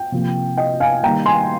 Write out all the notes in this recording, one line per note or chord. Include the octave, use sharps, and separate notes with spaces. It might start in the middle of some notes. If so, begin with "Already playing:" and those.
Already playing: G5
C3 F3 A#3
D#5 G5
F5 G#5
D#3 G3 A#3 G5 A#5
G#5 C6